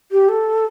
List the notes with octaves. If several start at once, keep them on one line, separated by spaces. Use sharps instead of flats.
G4
A4